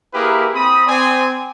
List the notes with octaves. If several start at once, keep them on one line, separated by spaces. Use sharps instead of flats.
A#3 E4 G4 G#4 A#4 B4
C4 B5 D#6
C4 D5 G#5